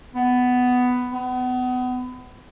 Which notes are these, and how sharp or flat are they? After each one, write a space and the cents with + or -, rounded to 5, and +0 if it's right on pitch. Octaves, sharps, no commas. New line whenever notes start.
B3 +10
B3 +30